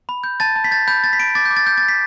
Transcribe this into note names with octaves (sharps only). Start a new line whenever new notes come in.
B5
G6
A5 A6
A5
B6
G6 A6
B5 G6
G6 A6
B6
B5 D7
D6 A6
G6
D6
A6
G6
A6
G6
B6